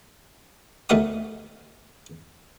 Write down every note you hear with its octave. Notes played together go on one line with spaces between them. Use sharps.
D2 A3 D#4 A#4 F#5 D#6